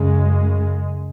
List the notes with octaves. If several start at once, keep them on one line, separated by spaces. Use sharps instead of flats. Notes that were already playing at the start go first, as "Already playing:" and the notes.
Already playing: F#2 C#3 G#3